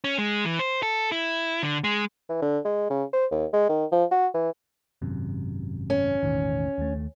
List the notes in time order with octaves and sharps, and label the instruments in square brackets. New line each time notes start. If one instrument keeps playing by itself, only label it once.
[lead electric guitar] C#4
G#3
E3
C5
A4
E4
D3
G#3
[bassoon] E3
D3
G#3
C#3
C5
D#2
G#3
D#3
F3
F#4
E3
[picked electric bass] G#1 F#2 C3
[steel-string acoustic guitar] C#4
[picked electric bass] E1 A1 D#3
D#2 A3